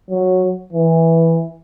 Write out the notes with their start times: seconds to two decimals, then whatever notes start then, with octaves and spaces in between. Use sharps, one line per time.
0.10 F#3
0.73 E3